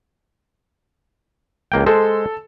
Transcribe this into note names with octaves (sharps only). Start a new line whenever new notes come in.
C#2 A#3 G5
G#3 A4 C5